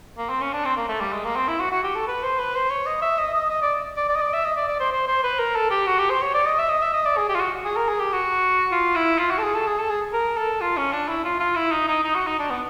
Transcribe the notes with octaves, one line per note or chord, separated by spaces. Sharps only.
A#3
C4
C#4
D4
C4
A#3
A3
G3
G#3
A#3
C4
E4
F#4
F#4
G4
A4
B4
C5
B4
C5
C#5
D#5
E5
D#5
D#5
D#5
D5
D5
D5
D#5
D5
E5
D#5
D5
D5
C5
C5
C5
B4
A#4
A4
G4
F#4
G4
C5
C#5
D5
D#5
E5
D#5
E5
D#5
D5
G#4
G4
F4
F#4
G#4
A#4
G#4
G4
F#4
F4
E4
F4
F#4
A4
G#4
A4
G#4
A4
G#4
A#4
A4
F4
C#4
D4
E4
F4
F4
E4
D#4
D#4
D#4
F#4
D#4
D4
B3